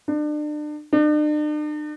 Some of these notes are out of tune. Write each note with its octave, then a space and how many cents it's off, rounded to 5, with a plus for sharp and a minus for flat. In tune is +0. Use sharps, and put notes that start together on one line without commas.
D4 +35
D4 +45